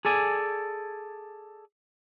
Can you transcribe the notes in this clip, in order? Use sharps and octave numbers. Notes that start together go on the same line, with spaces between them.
G#4 A4 D5 G#5